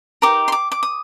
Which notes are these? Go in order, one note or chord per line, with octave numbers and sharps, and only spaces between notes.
D#4 G4 A#4 D6
C6
D6
D6
D#6